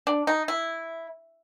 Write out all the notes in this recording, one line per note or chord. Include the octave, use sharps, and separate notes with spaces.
D4
D#4
E4